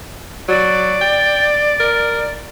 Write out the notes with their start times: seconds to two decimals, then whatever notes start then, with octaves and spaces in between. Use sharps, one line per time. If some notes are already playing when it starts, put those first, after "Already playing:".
0.48 F#3 D5
1.01 G5
1.80 A#4